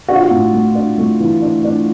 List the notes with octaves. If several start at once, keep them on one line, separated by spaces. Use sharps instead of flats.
D4 F#4
F4
F#4
A2
A3
D4
A3
E3
D4
D4